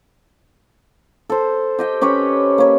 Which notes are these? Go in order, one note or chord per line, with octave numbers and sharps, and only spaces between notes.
A4 C5
G4 D#5 G5
C#4 G4 B4 C#5
A#3 C#5